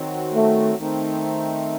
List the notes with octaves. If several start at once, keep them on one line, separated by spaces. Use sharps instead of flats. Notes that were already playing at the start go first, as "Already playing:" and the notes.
Already playing: D#3 F#3 C4 F#4
A3
D#3 A3 C4 D#4